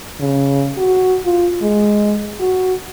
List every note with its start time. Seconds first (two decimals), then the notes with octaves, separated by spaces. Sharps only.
0.20 C#3
0.77 F#4
1.25 F4
1.62 G#3
2.40 F#4